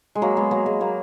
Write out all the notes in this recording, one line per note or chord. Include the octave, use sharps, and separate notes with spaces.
G#3
F#3 A#3
G#3 B3
F#3 A#3
G#3
F#3 A#3